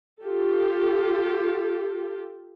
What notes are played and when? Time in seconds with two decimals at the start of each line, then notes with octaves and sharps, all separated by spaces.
0.22 F4 G4 A4